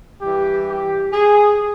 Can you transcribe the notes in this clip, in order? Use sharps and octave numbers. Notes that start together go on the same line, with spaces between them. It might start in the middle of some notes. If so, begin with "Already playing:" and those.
G2 E3 G4
G4
G#4